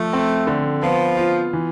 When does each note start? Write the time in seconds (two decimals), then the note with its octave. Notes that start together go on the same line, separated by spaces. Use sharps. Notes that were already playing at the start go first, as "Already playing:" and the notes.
Already playing: F3 A3
0.13 C4
0.47 D3
0.82 F3 B3
1.17 F4
1.53 E3